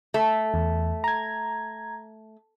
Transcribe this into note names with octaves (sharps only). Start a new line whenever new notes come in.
A3
E2
A#5 G#6